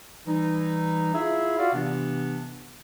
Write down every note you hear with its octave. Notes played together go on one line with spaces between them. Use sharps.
E3 G3 D#4
E4 F4 G#4 E5
F4 F#4 D5 F5
C3 E3 B3 D4